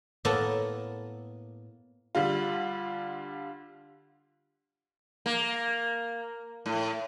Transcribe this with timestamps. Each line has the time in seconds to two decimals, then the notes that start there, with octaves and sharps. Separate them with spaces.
0.25 A2 A#3 B3 A4
2.15 D3 G3 F4
5.26 A#3
6.66 A2